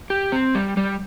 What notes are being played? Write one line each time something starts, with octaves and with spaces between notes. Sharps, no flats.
G4
C4
G3
G3